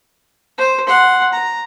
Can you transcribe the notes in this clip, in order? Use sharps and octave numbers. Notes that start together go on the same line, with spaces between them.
C5
F#5 C6
A#5